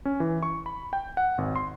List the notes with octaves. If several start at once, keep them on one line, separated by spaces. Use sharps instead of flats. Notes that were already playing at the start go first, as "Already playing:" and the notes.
C#4
E3
C#6
B5
G5
F#5
G#1
C6